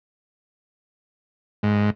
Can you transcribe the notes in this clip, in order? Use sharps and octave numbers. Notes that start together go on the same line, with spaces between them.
G#2